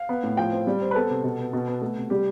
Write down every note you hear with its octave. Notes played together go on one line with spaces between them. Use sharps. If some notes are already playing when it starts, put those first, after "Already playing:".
Already playing: F5
B3
A2
F3 G5
C4
G3
C4
B4
B3 A4
C3
B2
B3
B2
B3
A3
C3
G3 G4